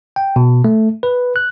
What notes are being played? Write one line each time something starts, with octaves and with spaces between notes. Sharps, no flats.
G5
B2
A3
B4
F#6